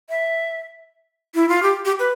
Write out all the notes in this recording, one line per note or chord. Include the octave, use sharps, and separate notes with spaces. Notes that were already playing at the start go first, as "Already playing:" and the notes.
E5
E4
F4
G4
G4
B4